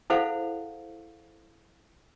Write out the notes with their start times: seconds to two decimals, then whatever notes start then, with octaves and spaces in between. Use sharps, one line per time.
0.10 E4 G#4 A4 C5 F5 F#5